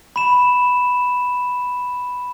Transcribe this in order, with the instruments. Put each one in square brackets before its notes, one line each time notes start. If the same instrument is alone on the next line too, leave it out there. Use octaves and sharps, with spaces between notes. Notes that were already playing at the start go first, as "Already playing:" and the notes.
[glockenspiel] B5 E7